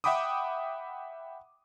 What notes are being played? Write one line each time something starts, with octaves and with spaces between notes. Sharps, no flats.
E5 F#5 G5 B5 D6 D#6